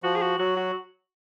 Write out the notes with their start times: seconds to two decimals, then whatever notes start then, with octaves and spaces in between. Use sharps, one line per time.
0.03 F3 F#4
0.16 G#4
0.22 F#4
0.39 F#3 F#4
0.57 F#4